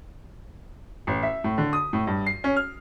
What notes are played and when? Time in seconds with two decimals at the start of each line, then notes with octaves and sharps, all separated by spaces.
1.07 A1
1.23 E5
1.44 A2
1.58 D3
1.73 D#6
1.93 A2
2.07 G2
2.26 C7
2.44 C#4
2.56 F6